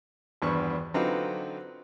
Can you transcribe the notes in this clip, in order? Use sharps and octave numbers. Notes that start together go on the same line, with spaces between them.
G#1 E2 G2 B3 C#6
D3 F#3 C4 D#4 F4 B4